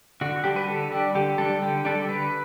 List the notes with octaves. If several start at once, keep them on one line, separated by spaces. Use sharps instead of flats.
D3 F#4
G3 D4 G4
B4
D3 A4
G3 D4 G4
D3 G4
G3 D4 A4
D3 G4
G3 D4 A4
D3 B4